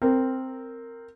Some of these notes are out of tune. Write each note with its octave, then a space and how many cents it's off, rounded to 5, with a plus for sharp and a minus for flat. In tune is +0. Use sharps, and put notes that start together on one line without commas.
C4 +0 A#4 -15